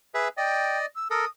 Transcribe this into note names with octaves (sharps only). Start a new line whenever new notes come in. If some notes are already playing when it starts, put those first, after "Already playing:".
G#4 B4 E5
D5 D#5 G5
E6
A4 A#4 D#6